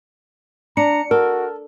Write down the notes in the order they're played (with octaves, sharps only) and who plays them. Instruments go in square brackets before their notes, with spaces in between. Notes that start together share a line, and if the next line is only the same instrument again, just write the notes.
[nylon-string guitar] D4 [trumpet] A#5 [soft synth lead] C#7
[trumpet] F#4 [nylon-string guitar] A4 [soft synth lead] A#4